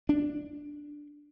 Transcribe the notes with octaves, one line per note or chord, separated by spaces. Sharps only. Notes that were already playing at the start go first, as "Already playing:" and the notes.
D4